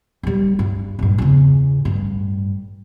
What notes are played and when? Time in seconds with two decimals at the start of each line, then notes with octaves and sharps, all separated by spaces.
0.23 D#2 G3
0.59 G2
0.99 A#1 G2
1.18 E2 C#3
1.85 A1 G2